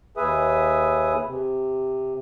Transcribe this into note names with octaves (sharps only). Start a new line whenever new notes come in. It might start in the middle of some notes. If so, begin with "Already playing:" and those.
D#2 G#4 B4 E5 D#6
C3